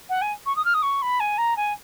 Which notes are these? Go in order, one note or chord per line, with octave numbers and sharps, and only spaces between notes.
F#5
G#5
C#6
D#6
F6
D#6
C#6
B5
G#5
A#5
G#5